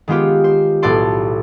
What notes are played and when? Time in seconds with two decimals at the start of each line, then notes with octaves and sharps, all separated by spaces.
0.08 D#3 G#3 B3 F4 G4
0.44 C5
0.83 B1 A2 B3 A4 D5 C6